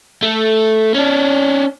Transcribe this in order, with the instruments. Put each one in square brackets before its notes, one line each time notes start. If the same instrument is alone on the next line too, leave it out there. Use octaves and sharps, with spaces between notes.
[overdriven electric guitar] A3
C#4 D4